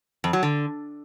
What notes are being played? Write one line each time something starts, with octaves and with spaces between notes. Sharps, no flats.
F2
F#3
D3